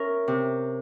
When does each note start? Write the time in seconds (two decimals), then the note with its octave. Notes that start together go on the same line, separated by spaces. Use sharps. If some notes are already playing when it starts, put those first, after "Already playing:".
Already playing: C#4 A#4 E5
0.28 C3